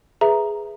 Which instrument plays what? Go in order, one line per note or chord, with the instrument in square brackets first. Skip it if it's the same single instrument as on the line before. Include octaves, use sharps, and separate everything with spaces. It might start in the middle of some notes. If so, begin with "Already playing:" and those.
[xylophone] G#4 B4 E5 A#5